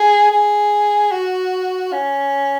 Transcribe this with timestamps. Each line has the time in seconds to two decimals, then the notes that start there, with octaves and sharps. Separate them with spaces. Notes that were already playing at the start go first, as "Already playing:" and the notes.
Already playing: G#4
0.31 G#4
1.12 F#4
1.92 C#4